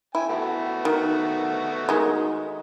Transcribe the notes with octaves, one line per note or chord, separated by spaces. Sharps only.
E4 G5 G#5
A3 B3 F#4
D#3
D#3 G#3